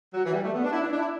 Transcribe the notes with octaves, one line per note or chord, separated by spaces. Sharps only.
F#3
E3
G3
A3
B3
D4
E4
D4
D4
E4